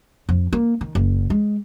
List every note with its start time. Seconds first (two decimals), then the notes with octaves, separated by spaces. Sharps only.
0.29 F2
0.53 A#3
0.81 D#3
0.95 F#1
1.30 G#3